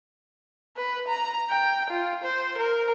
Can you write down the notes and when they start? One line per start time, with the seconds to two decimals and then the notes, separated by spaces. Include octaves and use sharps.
0.77 B4
1.08 A#5
1.50 G5
1.90 F4
2.23 C5
2.57 A#4